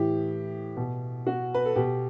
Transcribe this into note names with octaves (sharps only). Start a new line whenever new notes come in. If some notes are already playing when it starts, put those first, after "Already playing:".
Already playing: A2 E3 G4
B2
F#4
B4
A4
B2 G4